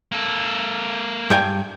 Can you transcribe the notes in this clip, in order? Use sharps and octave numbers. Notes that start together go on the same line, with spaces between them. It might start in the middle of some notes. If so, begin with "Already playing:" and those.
A#3 A4
G2 G5 G#5